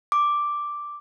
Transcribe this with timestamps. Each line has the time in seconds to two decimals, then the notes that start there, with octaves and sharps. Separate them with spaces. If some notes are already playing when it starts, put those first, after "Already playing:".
0.12 D6